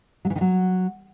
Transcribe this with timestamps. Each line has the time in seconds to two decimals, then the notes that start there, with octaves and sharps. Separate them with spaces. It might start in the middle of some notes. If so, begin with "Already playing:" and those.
0.25 F#3
0.30 E3
0.36 D#3
0.41 F#3